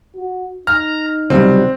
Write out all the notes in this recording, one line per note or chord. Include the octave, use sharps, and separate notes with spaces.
F#4
D#4 A#5 F6
C#2 C3 F#3 G3 C4